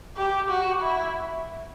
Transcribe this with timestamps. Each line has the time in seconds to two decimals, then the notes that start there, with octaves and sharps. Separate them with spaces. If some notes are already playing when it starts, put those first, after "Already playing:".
0.17 G4
0.49 F#4
0.81 E4